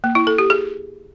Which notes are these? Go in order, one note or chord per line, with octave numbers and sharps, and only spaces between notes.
A#3
E4
A4
G4
G#4